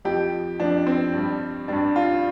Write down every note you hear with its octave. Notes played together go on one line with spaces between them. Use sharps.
F2 F3 G4
F2 F3 D4
C4
G2 G3
G2 G3 D4
F4